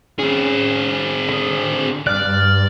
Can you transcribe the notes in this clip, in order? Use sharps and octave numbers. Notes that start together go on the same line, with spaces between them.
C4 C#4 G#4
D3 D#6
G2 D5 F6 F#6